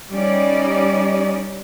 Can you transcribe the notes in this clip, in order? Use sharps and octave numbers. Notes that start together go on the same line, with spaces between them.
G3 C#4 D#4 D5